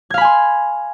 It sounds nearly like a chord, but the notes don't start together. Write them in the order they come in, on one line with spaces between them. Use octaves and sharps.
G#6 F5 B5 G#5 C6